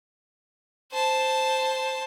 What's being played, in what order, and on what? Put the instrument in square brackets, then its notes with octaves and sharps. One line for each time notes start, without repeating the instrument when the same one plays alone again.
[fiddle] C5 A5